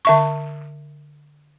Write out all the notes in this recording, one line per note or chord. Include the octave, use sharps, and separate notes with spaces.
D3 E5 C#6